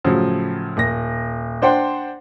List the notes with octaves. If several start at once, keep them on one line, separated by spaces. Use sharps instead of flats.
A2 C#3 F3 F#3
D#1 A#6
D4 C5 F#5 G5 C6